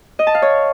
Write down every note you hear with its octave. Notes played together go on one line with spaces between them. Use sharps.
D#5
A5
F5
C#5